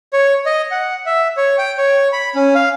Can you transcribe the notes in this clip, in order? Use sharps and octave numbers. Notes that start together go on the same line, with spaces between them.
C#5
D#5
F#5
E5
C#5
G5
C#5
B5
C#4
F5